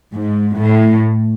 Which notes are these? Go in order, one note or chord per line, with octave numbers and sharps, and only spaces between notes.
G#2
A2